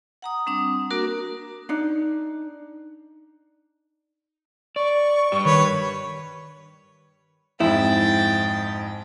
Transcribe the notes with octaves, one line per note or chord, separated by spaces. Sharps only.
F#5 A#5 D#6
G3 C4 D4 D#6
A#3 D4 F#4 A#4
D4 D#4
D5 C#6
G2 G4
D#3 B4 C#5
F2 G#2 E4 G5 A6